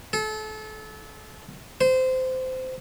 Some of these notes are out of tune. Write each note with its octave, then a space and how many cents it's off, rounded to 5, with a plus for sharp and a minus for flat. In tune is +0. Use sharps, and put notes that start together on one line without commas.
A4 -30
C5 -20